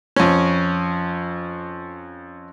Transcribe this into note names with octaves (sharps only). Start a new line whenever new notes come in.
F2 C#4